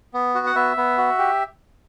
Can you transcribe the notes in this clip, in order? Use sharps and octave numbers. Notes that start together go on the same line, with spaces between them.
B3
F#4
F#5
B3 E5
B3
F#4
G4